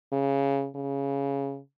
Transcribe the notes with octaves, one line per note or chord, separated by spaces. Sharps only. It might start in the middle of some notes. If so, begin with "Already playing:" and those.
C#3
C#3